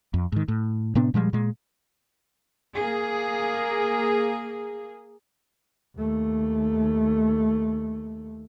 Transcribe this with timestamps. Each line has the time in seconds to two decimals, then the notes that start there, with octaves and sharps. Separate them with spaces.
0.14 F2
0.32 G#2 D#3
0.48 A2
0.95 A2 C3 B3 D4
1.14 A#2 F3 G3 G#3
1.33 A#2 G#3
2.75 A#3 G#4
5.96 D#2 A3